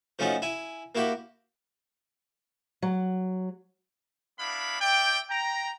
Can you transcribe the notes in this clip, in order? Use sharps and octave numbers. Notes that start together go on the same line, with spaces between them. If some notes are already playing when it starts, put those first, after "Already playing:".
F3 A3 C#4 D#4 F#4
E4 G#5
A#3 E4 F#4 G4
F#3
B3 D4 E4 F5 B5
D5 E5 G5
G5 A#5